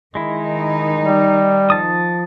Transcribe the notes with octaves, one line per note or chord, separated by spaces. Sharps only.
D#3 G#3 D#4 E4
G3
F3 A5 D#6